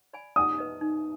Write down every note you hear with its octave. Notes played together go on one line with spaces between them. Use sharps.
D5 G#5 B5
D#4 D#6
B4 D#5
D#4